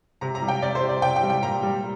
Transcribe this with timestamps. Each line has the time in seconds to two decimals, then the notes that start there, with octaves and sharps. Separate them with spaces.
0.21 C3 A#5
0.35 A#5
0.42 G3
0.48 G5
0.62 C3 D5
0.75 C5
0.83 G3
0.89 D5
1.02 C3 G5
1.16 G5
1.23 G3
1.30 G5
1.43 A#2 A#5
1.63 G3